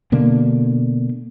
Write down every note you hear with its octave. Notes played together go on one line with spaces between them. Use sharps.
B2 D3 A#3 D4